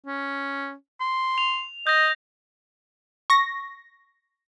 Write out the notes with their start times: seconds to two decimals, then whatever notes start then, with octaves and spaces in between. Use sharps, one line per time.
0.07 C#4
1.01 C6
1.38 F7
1.87 D#5 G6 A#6
3.30 C#6 A#6